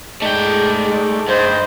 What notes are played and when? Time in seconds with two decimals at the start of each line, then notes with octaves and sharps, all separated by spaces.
0.22 G#3 A3 D#4 D5 G5
1.28 G2 C5 D#5